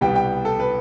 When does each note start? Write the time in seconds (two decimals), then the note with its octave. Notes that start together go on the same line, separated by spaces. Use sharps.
0.01 C2 B2 G3 B3 G5
0.15 G5
0.45 A4
0.60 B4